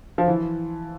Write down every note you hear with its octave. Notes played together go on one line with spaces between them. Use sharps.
F3
E3